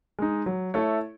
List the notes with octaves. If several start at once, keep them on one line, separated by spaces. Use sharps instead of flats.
G#3 D#4
F#3
A3 E4 A4 C#5